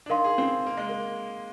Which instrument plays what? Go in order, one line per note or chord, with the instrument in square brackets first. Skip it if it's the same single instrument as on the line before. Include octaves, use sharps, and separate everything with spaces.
[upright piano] D4
[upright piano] D#4 [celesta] A#4 F5 C6
[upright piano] G#4
C4
A#3
G#3
A#3